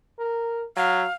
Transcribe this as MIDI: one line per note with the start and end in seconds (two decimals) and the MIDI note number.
0.19 0.64 70
0.77 1.04 54
0.77 1.14 77